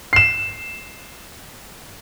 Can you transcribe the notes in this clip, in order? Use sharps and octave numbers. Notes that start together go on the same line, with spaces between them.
C7 E7